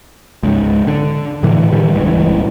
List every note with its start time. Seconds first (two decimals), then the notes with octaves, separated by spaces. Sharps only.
0.43 C#2 G#2
0.87 D3
1.43 A2 D3 E3
1.72 D#3 E3 G3
1.94 D#1 C#2 G2 E3